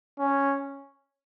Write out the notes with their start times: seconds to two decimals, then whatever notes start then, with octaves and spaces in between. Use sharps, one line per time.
0.19 C#4